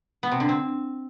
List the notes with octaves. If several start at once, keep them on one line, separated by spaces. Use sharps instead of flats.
B3
C3
D3
C4